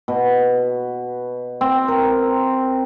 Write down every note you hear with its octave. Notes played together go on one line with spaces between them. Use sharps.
B2
C4
A#4